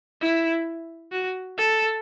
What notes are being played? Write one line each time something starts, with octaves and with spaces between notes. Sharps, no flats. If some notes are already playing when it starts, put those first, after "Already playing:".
E4
F#4
A4